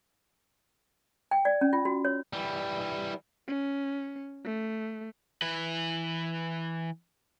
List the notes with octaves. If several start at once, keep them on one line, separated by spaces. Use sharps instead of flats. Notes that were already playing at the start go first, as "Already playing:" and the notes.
G5
D5
C#4
F4
F#4
C#5
E3 G3
C#4
A3
E3 B4